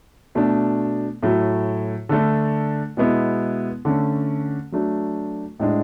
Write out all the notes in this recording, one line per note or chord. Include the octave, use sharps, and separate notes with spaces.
B2 A3 D4
A2 F#3 A3
D3 A3 D4
B2 G#3 B3 E4
D3 A3 C#4
F#3 A3 D4
A2 G#3 D4